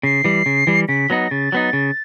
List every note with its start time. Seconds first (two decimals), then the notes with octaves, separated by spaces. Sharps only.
0.03 C#3 C7
0.24 E3 G3
0.46 C#3
0.67 E3 G3
0.88 C#3 B6
1.10 F#3 B3 D#4 A#6
1.31 C#3 A6
1.52 F#3 B3 D#4
1.73 C#3